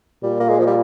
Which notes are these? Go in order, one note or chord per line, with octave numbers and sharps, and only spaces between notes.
A#2 G3
A#3
G#3
F3
G3